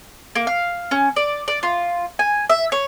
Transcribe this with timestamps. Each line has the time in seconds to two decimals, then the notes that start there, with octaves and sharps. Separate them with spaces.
0.35 A#3
0.47 F5
0.91 C#4
1.16 D5
1.48 D5
1.63 F4
2.19 G#5
2.50 E5
2.72 C#5